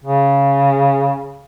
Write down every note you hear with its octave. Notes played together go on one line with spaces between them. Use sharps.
C#3